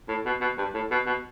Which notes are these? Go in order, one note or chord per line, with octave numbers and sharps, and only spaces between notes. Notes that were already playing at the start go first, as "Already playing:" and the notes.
A2
B2
B2
G2
A2
B2
B2